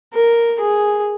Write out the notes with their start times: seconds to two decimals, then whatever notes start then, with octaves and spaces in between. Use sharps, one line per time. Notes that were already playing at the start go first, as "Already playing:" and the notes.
0.13 A#4
0.60 G#4